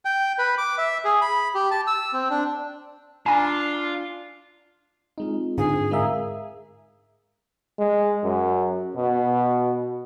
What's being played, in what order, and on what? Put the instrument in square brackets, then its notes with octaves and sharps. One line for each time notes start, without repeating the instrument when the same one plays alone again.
[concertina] G5
B4
D6
E5
G#4
B5
G4
A5
E6
C4
D4
[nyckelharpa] D4 [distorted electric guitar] F4 [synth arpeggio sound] G#5 A#5
[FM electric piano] G#3 D#4 [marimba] C4 F4
[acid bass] G#2 [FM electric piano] D3 [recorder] G#4
[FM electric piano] G#3 E5 [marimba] A#4 F5 A#5
[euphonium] G#3
F#2
B2